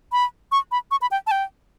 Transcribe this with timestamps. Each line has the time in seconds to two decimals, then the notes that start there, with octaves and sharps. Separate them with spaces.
0.12 B5
0.52 C#6
0.72 B5
0.91 C#6
1.02 B5
1.11 G5
1.27 A5
1.31 G5